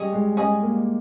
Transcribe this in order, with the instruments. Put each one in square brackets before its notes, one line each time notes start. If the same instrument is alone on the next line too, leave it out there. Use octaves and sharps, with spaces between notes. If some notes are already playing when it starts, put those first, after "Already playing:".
Already playing: [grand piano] G3 [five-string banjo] C#4 G#4 D#5
[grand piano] G#3
[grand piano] G#3 [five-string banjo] C#4 G#4 D#5
[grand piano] A#3